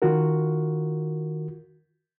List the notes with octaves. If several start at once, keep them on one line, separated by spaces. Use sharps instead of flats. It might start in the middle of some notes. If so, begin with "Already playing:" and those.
D#3 F4 F#4 A#4